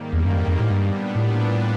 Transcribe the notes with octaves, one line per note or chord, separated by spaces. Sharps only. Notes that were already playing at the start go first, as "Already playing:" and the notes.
Already playing: G#2 D#3 G3 A#3
E2
F#2
F2
F2
A2
G2 A#2 G3 B3 D4
A2